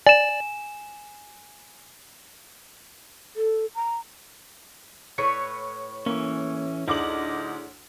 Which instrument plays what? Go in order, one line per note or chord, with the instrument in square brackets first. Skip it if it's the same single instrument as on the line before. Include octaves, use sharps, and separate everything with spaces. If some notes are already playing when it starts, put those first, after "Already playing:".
[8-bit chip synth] D5 [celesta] G#5 E7
[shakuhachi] A4
A#5
[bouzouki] A2 B4 C#5 [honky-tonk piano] C#7
[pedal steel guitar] E3 C#4 [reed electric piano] A#3
[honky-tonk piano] D2 D6 F#7 [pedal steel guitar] D#4 [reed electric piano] E4 G#4 D5